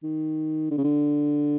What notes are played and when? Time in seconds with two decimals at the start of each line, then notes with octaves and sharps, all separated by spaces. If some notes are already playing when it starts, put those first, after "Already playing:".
0.03 D#3
0.71 D3
0.78 C#3
0.84 D3